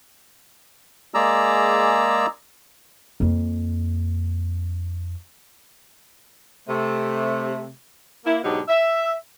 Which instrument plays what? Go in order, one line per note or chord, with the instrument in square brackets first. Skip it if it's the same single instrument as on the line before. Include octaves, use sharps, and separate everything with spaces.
[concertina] G#3 A#3 G#4 D5 A#5 E6
[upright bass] F2 A#3
[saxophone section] C3 A3
A#3 E4
G#2 B2 F#3 D4 D#4 G4
E5